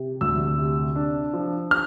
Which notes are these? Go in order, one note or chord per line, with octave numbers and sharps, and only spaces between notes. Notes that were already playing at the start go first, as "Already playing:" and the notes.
Already playing: C3
D2 E6
C3
D4
F3
F6